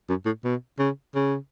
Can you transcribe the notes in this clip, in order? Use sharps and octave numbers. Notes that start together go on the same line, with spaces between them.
F#2
A2
B2
C#3
C#3